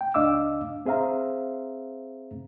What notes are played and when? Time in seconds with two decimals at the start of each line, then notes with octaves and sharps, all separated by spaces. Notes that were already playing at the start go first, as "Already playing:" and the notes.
0.01 G5
0.14 C#2 D4 D#5 F5 D6 E6
0.86 C4 G#4 C5 E5 F5 A#5